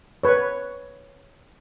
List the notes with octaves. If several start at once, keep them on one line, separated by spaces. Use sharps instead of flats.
B4 C#5